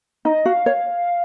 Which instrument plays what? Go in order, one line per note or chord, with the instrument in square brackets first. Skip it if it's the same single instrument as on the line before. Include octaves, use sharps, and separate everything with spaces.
[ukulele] D#4 [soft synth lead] D#5
[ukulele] F#4 [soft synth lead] F5
[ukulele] C#5